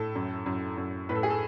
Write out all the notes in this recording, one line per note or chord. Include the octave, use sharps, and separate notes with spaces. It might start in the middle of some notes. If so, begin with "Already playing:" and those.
Already playing: A2 A4
F#2
F#2
F#2
A2 B4
A4
G#4
A4